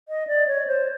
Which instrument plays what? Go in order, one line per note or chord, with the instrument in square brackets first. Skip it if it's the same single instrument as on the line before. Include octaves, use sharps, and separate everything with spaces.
[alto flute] D#5
D5
C#5
C5